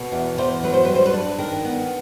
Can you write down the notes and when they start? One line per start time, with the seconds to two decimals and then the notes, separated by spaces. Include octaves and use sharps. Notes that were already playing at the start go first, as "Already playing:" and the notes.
Already playing: B2
0.12 E2
0.38 E2 C5
0.63 F#3 B4
0.73 C5
0.85 G3 B4
0.95 C5
1.06 B4
1.13 D4
1.38 D#3 A#4
1.65 B3